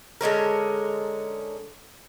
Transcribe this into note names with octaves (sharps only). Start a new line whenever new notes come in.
D3 G#3 C#4 A#4